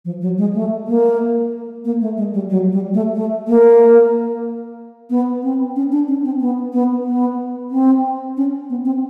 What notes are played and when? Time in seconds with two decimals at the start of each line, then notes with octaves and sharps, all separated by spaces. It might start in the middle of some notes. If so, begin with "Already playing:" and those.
0.05 F3
0.21 F#3
0.38 G#3
0.54 A3
0.88 A#3
1.85 A#3
2.01 A3
2.17 G#3
2.34 G3
2.50 F#3
2.72 G3
2.94 A3
3.15 A3
3.48 A#3
5.10 B3
5.43 C4
5.76 C#4
5.92 D4
6.08 C#4
6.25 C4
6.40 B3
6.73 B3
7.06 B3
7.71 C4
8.37 C#4
8.70 B3
8.85 C4